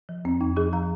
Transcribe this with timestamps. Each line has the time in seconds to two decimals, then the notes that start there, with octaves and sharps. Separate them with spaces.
0.09 F3
0.25 F2 C4
0.41 F2 D#4
0.57 F3 D#4 G#4
0.73 F3 F5 A#5